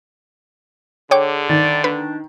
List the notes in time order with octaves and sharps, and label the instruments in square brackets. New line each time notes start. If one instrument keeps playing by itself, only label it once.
[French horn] D3 [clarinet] G#4 [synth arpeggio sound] C#5 G5 D6
[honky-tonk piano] D#3 [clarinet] D5
[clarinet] D4 [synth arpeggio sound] B4